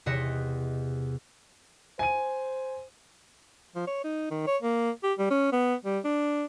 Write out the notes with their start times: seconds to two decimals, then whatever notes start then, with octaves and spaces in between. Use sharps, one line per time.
0.06 E2 C3 B4 D#5 E5 C#7
1.99 C5 G#5 D#7
3.75 F3
3.87 C#5
4.04 D#4
4.31 D#3
4.47 C#5
4.62 A#3
5.03 G4
5.18 G3
5.30 C#4
5.52 B3
5.85 G3
6.04 D4